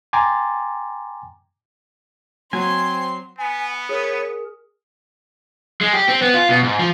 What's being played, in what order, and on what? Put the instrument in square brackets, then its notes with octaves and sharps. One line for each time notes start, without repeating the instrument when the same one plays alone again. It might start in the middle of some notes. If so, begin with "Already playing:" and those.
[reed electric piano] G5 G#5 A#5 C6 D6 A6
[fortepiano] F#3 [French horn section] C4 [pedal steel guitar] G#5 [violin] C6
[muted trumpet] B3 [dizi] G#5
[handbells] G#4 A#4 [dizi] C#5
[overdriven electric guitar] G#3
G4
C4
B3
F4
B2
G#2
F3